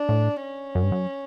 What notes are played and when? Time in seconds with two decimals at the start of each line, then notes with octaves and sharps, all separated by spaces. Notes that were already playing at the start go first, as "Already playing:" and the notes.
Already playing: D4
0.09 A2
0.42 C#4
0.75 F#2
0.83 G2
0.92 F#2